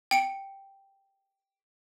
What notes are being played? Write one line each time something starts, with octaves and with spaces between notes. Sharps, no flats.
G5 C#7 D7